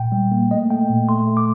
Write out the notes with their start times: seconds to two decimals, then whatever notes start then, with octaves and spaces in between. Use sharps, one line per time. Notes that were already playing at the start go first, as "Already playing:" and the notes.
Already playing: A#2 G5
0.12 G3
0.31 A#3
0.51 A3 D#5
0.70 A3 G5
0.89 A#2
1.09 A3 C6
1.27 A3
1.37 D6